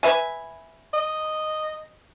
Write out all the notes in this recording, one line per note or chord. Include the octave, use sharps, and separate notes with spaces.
B4 E5 G#5
D#5